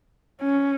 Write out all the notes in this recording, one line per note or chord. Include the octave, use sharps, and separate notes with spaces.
C#4